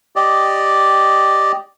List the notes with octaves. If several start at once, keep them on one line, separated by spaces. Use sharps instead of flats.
G4 D5 D#5